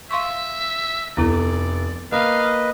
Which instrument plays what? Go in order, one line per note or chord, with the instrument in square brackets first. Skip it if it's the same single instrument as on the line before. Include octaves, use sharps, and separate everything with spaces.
[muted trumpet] E5 [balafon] F5 C6 C#6
[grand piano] F1 [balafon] B3 E4 A4 [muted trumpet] D5
[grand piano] A#3 [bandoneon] B4 D#5 [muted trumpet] F5